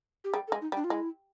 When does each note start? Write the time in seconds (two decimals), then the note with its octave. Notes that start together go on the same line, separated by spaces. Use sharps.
0.24 G4
0.34 G3 G#4
0.48 A4
0.52 G#3
0.61 D#4
0.72 G3
0.77 D4
0.84 F4
0.90 G#3 E4